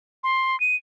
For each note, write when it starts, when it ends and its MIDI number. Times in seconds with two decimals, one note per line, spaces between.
0.24 0.59 84
0.60 0.76 99